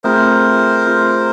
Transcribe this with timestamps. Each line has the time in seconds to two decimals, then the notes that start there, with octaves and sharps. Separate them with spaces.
0.04 A3 C4 F4 G#4 A#4 C5
0.86 A3 C4 F4 G#4